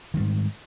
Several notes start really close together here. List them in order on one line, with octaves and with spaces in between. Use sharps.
D#3 G3 G#2